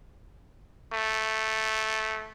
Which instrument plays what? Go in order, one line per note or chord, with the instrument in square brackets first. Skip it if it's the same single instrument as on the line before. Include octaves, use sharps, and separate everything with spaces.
[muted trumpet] A3